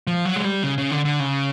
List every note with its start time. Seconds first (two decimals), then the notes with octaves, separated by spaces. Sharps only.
0.07 F3
0.25 F#3
0.36 G#3
0.45 G3
0.63 C#3
0.78 C#3
0.91 D3
1.05 D3
1.20 C#3